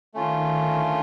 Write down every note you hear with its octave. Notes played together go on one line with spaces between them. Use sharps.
D#3 A3 C#4 F4
D3